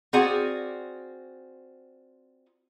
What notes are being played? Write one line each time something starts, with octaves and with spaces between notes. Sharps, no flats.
C4 F4 F#4 G#4 D5